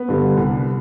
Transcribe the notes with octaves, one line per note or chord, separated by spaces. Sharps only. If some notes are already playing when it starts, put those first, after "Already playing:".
Already playing: B3 B4
G2 D3 G3
C2